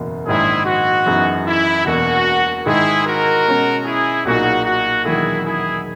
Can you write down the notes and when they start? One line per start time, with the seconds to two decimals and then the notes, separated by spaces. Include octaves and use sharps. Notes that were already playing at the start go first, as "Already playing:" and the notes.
Already playing: F#1 E2 B2 A#3
0.26 A#1 G#2 D#3 G#3 D#4 E4 G#4
0.66 F#4
1.06 F#2 E3 B3 D#4 G#4
1.47 E4
1.86 E1 E2 B2 A#3 F#4
2.66 G#2 D#3 G#3 D#4 E4 G#4
3.06 F#4 A#4
3.46 B2 G#3 C#4
3.85 E4 G#4
4.25 B1 A#2 A#3 D#4 F#4 G#4
4.65 F#4
5.05 E1 E2 D#3 F#3 A#3 E4 G#4
5.45 E4 G#4